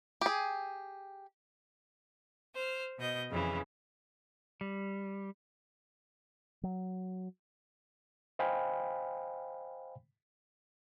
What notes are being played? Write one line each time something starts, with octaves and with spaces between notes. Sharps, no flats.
G4 G#4
C5 F6
B2 D#5 G6
F2 C#3 E3
G3
F#3
C5 D#5 F5 G5 G#5 B5